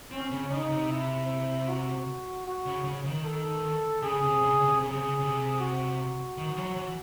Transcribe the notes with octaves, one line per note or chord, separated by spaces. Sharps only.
C4 C#4
C#3
C#3 D#4
C3
E4
F#4
F#4
C#3
C#3
D#3
A4
C#3 G#4
C3
C#3
C3
C#3 G#4
C3
C#3
C3
F#4
D#3
E3
F#3
E3